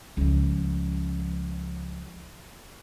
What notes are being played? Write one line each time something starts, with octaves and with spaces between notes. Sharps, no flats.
C#2 F3